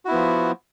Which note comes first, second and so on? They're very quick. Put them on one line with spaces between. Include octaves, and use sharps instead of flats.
F#4 E4 B3 F3